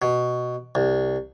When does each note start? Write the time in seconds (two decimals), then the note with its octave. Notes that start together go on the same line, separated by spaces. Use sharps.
0.02 B2
0.75 C2